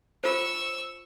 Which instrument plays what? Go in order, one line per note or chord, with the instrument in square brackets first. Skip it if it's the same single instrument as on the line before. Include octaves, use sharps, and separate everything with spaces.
[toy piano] F4 C5 [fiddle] C#6 E6